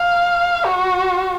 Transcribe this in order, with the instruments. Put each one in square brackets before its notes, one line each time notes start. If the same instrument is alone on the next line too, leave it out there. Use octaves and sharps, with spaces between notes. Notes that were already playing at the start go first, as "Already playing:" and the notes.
Already playing: [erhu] F5
F#4